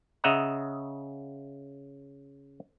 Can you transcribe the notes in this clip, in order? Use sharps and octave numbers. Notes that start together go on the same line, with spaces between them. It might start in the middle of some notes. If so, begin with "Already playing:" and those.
C#3 D#5 E5 F#5 A#5